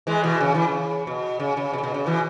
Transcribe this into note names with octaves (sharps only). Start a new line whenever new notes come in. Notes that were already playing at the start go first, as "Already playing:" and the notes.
E3 G#3
B2 E3
C#3
E3
C#3
B2
C#3
C#3
B2
C#3
B2
C#3
B2 E3